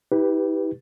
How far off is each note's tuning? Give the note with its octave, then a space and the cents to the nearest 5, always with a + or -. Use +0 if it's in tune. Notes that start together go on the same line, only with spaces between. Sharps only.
E4 -45 G4 +0 B4 +0